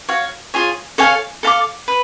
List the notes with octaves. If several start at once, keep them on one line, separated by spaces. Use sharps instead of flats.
F#4 C#5 F5
F4 G#4 C#5
A4 C#5 F5 G#5
A4 F5 A5 D6
B4